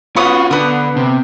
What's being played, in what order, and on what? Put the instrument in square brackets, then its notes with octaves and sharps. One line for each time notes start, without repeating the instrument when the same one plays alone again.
[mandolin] B3 C#4 D#6 [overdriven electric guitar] F4 F#4
[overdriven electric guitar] D3 [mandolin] B3 D#6
[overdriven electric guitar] C3